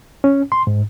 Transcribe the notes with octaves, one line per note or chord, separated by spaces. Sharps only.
C#4
C6
G#2